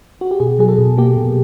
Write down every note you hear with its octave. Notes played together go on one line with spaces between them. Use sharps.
F#4
G4
B2 G#4
F#3 G#4
A4
B2
A#3 G4
B2